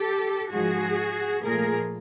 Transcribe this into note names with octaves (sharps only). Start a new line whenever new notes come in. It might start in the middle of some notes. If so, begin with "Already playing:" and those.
Already playing: G4 A4
G#2 F3 G#3 F#4 G#4
A#2 F3 A3 G#4 A#4